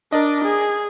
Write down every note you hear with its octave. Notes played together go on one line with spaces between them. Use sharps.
D4 A#4 D5 D#5
G#4